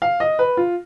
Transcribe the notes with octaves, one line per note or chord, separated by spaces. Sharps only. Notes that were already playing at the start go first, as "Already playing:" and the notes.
F5
D#5
B4
F4